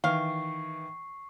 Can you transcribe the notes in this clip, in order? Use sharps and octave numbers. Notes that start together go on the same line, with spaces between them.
D#3 E3 F5 C#6 C7